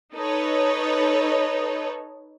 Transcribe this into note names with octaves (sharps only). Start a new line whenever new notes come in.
D#4 A4 B4 C#5